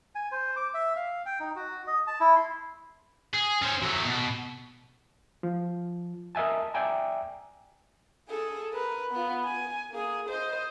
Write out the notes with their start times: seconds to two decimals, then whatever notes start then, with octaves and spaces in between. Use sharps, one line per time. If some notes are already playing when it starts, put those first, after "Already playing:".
0.15 G#5
0.32 C5
0.56 D6
0.74 E5
0.96 F5
1.26 G5
1.40 D#4
1.56 F#4
1.87 D#5
2.07 A5
2.20 E4
2.36 C6
3.34 G#4
3.62 C#4 C5
3.82 F#3 A3
4.06 B2
5.43 F3
6.35 A#4 D#5 E5 G#5 A5
6.74 D5 E5 G5 G#5 A#5
8.29 G#4 A4
8.74 A#4 B4
9.11 B3 F4
9.45 G#5
9.91 A#3 G#4
10.29 C5 D#5